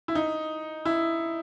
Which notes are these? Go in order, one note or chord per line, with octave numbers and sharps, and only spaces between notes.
E4
D#4
E4